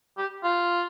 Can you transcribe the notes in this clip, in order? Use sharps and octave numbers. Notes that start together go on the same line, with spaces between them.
G4
F4